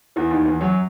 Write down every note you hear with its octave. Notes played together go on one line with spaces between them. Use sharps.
E2 E3
D#2 D#3
E2 E3
F#2 F#3